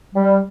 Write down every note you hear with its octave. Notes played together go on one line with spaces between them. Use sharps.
G3